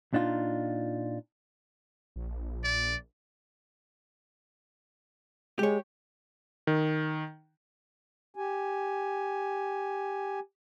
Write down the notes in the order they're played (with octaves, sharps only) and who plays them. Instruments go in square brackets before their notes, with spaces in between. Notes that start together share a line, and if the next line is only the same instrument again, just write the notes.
[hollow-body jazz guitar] A#2 D4 D#4 F4
[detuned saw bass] A#1
[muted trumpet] D5
[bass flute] G#3 [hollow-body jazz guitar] G4 C#5
[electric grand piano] D#3
[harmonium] G4 G#5